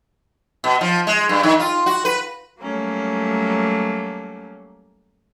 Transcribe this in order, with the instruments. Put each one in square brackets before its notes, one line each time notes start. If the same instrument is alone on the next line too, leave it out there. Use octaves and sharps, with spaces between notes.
[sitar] B2
F3
G#3
G2
D#3
F4
F#4
B4
[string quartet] F#3 G3 A3 A#3 C#4